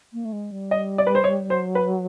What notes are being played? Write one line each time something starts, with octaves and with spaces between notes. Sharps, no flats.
A#3
A3
G#3
G3
D#5
D5
B4
C5
C#5
F#3 C5
B4